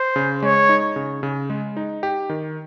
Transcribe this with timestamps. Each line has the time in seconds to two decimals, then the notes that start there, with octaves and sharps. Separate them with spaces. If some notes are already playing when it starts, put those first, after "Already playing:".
Already playing: C5
0.16 C#3
0.43 G#3 C#5
0.69 D#4
0.96 C#3
1.23 C#3
1.50 G#3
1.77 D#4
2.03 G4
2.30 D#3